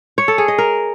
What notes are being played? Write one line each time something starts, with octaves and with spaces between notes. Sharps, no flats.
C#5
A4
G#4
D#5
A#4